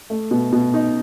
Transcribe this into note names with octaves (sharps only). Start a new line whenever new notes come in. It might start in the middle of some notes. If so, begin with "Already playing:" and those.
A3
B2
B2
D#4